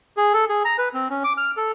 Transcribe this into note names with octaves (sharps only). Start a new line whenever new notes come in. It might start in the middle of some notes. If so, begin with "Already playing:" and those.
G#4
A4
G#4
A#5
B4
C4
C#4
D6
F6
A4